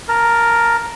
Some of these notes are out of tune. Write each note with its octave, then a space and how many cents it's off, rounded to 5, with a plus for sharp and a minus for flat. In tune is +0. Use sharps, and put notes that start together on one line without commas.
A#4 +0 A5 +15